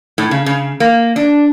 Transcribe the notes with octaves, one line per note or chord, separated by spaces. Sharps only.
A2
C#3
C#3
A#3
D4